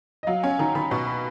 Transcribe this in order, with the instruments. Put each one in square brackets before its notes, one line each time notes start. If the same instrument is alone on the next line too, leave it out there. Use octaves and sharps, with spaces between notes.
[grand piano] D#5
[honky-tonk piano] F#3 [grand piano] F5
[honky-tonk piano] C#4 [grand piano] G#5
[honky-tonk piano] D#3 [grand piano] A#5
[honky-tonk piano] D#3 [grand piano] B5
[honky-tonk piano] B2 [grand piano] C#6
[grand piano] B5